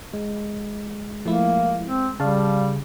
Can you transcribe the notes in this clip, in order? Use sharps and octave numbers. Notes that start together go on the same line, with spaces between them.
G#3
F3 A3 A#3 E4
C4
C#3 G3 D5 F5 A5